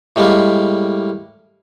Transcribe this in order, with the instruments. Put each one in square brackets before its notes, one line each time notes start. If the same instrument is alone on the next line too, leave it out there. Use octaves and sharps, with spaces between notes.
[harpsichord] A2 G3 G#3 A#3